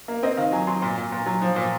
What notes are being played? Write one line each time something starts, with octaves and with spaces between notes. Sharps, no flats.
A#3
C4 D#5
D#3 F5
F#3 G#5
F#3 C6
A#2 C6
A#2
A#2
F#3
F3
A#2